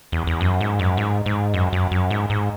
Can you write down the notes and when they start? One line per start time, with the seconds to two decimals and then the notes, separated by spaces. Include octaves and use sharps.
0.12 E2
0.27 E2
0.41 F#2
0.61 G#2
0.79 F#2
0.97 G#2
1.26 G#2
1.54 F#2
1.73 F#2
1.92 F#2
2.11 G#2
2.30 G#2